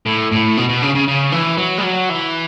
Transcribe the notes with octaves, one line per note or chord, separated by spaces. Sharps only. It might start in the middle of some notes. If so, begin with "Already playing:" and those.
A2
A2
B2
B2
C#3
C#3
C#3
E3
F#3
G3
F#3
E3